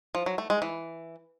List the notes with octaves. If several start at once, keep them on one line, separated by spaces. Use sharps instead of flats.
F3
F#3
A3
G#3
E3